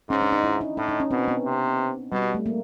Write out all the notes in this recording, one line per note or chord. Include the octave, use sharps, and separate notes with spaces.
G#2 C#4
D4
D#4
E4
D#4
A2 D#4
D#4
C#4
B2 C4
B3
C3
B2 G3
A3
A#3